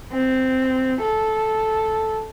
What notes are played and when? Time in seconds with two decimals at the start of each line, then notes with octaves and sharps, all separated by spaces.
0.12 C4
1.01 A4